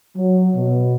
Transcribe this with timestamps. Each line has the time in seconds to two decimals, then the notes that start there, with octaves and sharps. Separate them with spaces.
0.16 F#3
0.55 B2